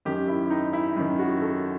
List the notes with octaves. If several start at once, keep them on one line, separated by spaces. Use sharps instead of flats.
F#2 D#3 G4
E4
D#4
E4
F#2 D#3
F#4
A4